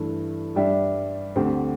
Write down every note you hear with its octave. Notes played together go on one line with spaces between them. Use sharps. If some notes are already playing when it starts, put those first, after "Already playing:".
Already playing: G2 E3 A3
G2 G3 D4 G4 E5
D2 D3 C4 G4 C5